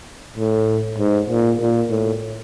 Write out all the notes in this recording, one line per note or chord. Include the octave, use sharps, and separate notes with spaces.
A2
G#2
A#2
A#2
A2